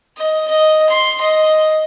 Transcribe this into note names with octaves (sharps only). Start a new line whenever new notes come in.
D#5
D#5
C6
D#5